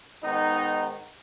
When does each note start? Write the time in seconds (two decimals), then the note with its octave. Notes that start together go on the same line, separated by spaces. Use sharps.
0.23 G#2 D#3 B3 D#4